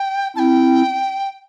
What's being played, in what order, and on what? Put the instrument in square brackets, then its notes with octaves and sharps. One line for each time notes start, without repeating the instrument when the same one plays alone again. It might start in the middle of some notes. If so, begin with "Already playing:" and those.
Already playing: [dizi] G5
[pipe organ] C4 E4 [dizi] G5 A5